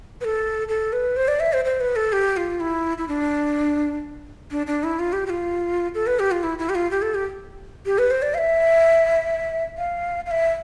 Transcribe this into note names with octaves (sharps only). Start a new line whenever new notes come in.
B4
A4
A4
B4
C5
D5
E5
C5
C5
B4
A4
G4
F4
E4
E4
D4
D4
D4
E4
F4
G4
G4
F4
A4
B4
G4
F4
E4
E4
G4
F4
G4
A4
G4
G4
B4
C5
D5
F5
E5
F5
F5
E5